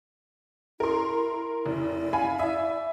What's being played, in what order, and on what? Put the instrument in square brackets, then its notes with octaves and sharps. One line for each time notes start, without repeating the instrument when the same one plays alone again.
[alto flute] E4 [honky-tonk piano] A#4 C6
[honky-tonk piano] F1 [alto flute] E4
[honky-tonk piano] F5 G#5 B5
[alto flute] D5 [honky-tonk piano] E5